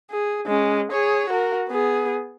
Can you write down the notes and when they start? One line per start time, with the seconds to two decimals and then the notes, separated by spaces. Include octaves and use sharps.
0.11 G#4
0.46 G#3 C#4
0.91 G#4 C#5
1.30 F#4 A#4
1.68 B3 G#4